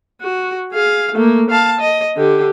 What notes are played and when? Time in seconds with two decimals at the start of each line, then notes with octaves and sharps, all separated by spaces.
0.21 F#4
0.72 G#4 F5
1.14 A3 A#3
1.50 F5 A5
1.80 D#5
2.16 D3 G4